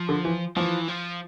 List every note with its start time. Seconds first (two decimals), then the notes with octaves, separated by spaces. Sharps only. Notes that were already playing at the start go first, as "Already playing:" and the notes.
Already playing: F3
0.09 D3
0.25 E3
0.57 E3 F3
0.88 F3